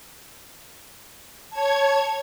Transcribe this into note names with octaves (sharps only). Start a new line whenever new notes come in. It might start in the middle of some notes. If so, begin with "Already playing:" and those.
C#5 A5 G#6